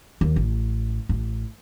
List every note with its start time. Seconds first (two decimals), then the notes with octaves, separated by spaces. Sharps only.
0.21 D#2
0.36 A1
1.09 A1